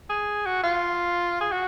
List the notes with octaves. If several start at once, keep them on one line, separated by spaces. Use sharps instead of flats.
G#4
F#4
F4
G#4
F#4